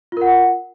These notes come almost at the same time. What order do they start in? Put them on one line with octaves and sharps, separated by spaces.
F4 A#4 F#5